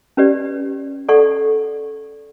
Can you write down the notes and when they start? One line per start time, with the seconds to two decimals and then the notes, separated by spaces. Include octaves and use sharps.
0.17 C#4 G4 B4 D5
1.09 A4 D5 F#5 C#6